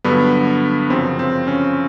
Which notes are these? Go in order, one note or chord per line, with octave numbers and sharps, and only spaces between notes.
G2 D3 F#3 B3
F#2 C#3 F3 C4
C4
C#4